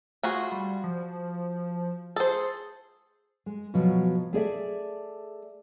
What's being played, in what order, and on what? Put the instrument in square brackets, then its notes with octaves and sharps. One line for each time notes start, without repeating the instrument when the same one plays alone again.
[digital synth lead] A3 [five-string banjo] F4 F#4 G#4
[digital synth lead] G3
F3
[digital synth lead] G#4 [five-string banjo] A4 C5
[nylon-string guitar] G#3
B2 F3 F#3
A3 G#4 D5 E5